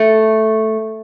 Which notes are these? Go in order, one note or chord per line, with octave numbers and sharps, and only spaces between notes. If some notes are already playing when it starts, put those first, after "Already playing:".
Already playing: A3